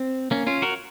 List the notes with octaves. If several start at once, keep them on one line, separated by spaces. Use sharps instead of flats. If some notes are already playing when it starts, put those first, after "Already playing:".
Already playing: C4
A#3 C#4
C#4 F4
F#4 A#4